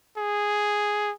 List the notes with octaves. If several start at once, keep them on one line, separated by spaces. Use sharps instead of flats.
G#4